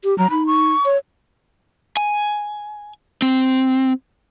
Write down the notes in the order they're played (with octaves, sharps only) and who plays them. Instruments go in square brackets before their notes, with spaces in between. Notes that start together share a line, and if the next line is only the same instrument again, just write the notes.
[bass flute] G4
[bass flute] F#3 [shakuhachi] A#5
[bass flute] D#4 [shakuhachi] B5
[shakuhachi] C#6
[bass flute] C#5
[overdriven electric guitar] G#5
C4